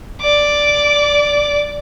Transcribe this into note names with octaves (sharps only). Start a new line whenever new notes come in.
D5 D6